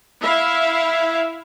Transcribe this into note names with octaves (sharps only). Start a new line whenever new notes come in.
E4 E5 F5